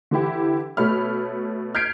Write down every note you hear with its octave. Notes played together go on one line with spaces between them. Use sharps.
D3 E3 E4 G4
B2 A3 C#5 B5 F6
F6 G6 G#6 B6 C7 D7